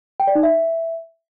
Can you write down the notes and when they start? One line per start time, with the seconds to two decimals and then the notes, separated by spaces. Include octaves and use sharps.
0.20 G5
0.27 D5
0.35 D#4
0.43 E5